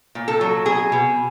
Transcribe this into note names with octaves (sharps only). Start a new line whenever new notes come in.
A#2
A4
F#3
B2 G#4
B2